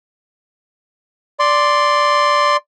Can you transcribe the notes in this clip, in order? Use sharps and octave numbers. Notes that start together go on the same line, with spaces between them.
D5 C6